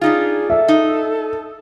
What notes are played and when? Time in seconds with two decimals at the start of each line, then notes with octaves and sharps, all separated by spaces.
0.01 D4 D#4 F4 G#4
0.50 A4 E5
0.68 D#4